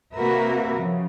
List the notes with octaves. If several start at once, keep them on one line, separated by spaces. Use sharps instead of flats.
C3 A#3 F#4 A#4 B4 E5
C#3 F3